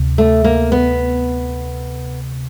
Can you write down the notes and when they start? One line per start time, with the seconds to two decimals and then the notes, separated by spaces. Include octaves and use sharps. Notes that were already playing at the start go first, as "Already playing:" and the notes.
Already playing: D2 C3
0.18 A3
0.44 A#3
0.72 B3